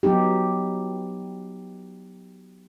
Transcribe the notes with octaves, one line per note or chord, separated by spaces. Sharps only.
F#3 B3 D#4 G4